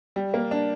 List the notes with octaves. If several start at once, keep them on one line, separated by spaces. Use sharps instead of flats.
G3
A#3
D4